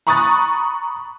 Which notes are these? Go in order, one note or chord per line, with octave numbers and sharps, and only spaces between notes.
A#5 B5 C#6 D#6 F#6 A6